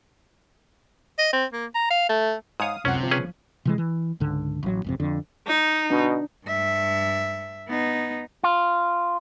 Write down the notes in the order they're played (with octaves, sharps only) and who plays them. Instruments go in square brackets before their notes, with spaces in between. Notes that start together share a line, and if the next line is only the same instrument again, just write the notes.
[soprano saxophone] D#5
C4
A#3
A#5
F5
A3
[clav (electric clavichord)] G#2 C#5 [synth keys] F5 D#6
[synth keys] C#2 F#2 F#5 [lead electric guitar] C3 [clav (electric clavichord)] C#4
[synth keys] G1 F3
[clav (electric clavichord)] C#4 G#4 B4
[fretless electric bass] C3 E3 G#3
E3
C#2 G#2 D3
A1 F#3
G#1 F2 C3
F2 D3
[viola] D#4
[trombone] B2 [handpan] D4
[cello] G2 E5
B3 D#4
[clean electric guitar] F4